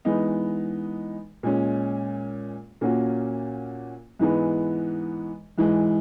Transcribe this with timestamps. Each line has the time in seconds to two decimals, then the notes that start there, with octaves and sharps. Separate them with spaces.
0.05 E3 G#3 B3 D#4
1.43 A#2 G#3 C#4
2.81 A#2 A#3 C#4 F#4
4.19 G#2 E3 G#3 B3
5.58 G#2 E3 G#3